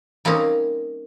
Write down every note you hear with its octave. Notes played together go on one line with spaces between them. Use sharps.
G3 A#3 C4 C#4 D#4